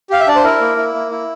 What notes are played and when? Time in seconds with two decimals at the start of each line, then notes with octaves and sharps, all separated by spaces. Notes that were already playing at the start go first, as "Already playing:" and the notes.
0.10 G4 F5
0.20 E5
0.27 D4 D5
0.36 C5
0.44 E4 A#4
0.61 A#3
0.77 E4
0.94 A#3
1.11 E4